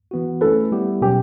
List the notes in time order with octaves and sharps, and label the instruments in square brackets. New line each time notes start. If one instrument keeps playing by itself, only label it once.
[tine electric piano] E3 B3 F#4
[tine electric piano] A3 C#4 E4 B4 [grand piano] A4
[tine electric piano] G3 B3 E4 G4
[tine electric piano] B2 F#3 C#4 [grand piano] G4